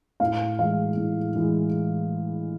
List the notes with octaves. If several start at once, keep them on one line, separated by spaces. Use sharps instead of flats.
A2 F5
E3 G#3 F5
A2
E3 G#3